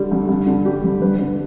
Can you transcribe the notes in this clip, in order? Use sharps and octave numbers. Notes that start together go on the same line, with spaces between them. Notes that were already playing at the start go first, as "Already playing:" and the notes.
Already playing: D3 G3
G2
G2
D3
G3 G4
G2
G2 B4
D3 B4